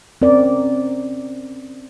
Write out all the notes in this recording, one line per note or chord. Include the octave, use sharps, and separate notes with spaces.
C4 C#4 A#4 D5